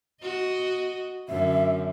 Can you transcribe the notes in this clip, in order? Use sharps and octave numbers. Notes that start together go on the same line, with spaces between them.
F#4 D#5
F#2 D3 E5